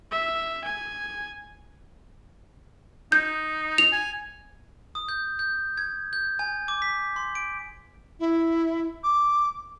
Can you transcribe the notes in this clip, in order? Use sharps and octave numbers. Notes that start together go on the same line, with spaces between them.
E5
G#5
D#4 G6
F7
G#5
D#6
G6
G6
G#6
G6
G#5
D6
B6
C6
D7
E4
D6